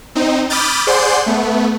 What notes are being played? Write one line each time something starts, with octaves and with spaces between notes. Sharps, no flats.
C4 D#4
B5 D6 D#6 F6 G6 A6
G#4 C5 D5 F#5 C6 G6
A3 B3